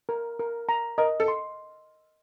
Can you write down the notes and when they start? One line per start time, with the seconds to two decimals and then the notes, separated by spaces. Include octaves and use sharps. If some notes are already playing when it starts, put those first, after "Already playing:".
0.09 A#4
0.39 A#4
0.69 A#5
0.98 A#4 D#5
1.20 A4
1.28 C6